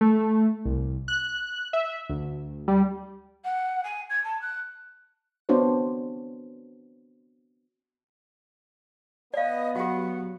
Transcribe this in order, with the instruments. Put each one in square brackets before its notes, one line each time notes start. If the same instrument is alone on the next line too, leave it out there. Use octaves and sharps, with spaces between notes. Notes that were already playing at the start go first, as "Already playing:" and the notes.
[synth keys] A3
C2
F#6
E5
D2
G3
[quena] F#5
G#5
G#6
A5
F#6
[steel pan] B3 C4 D4 F#4 C5 C#5
[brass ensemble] B3 [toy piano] D5 F5 [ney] D#5
[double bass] F#3 [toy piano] F#4 G4 [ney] F#5